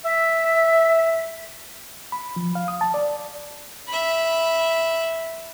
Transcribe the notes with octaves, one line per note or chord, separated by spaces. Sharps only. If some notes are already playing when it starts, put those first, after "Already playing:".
E5
B5
F3
F5
D#6
A5
D5
E5 B5